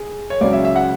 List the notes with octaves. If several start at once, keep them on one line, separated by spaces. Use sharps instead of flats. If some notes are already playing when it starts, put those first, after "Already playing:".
Already playing: G#4
C#5
C#2 C#3 F#3 D5
E5
E5
F#5